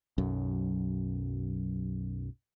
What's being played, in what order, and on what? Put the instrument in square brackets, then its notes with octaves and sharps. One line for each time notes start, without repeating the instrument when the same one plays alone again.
[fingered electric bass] B1 F#2